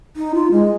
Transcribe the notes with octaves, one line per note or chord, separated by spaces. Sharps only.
D#4
F4
G#3